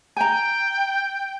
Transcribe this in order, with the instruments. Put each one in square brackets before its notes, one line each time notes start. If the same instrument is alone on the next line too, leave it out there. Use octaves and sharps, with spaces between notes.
[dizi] G5 [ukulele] G#5 A#5